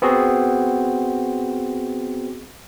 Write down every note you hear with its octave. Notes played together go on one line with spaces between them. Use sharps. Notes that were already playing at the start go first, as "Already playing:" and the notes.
B3 C4 F#4 G#4